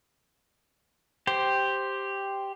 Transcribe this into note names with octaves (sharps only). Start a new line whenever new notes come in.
G4 C5